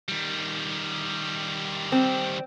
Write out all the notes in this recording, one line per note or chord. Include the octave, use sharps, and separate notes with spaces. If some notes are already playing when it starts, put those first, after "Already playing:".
D#3 G3
C4